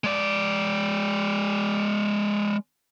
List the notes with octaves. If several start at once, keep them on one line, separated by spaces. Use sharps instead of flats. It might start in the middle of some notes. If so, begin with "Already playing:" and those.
G#3 D5